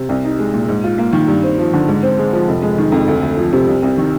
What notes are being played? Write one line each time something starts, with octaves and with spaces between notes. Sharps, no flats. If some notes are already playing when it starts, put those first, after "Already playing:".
Already playing: C3
C2
D#4
G#3
A#2
G#2
F4
A#3
D#3
G2
C4
F3
D3
G#2
C4
G#3
F3
F1
G#3
D#3
F2
D2
D2
F3
C3
C2
C2
D#3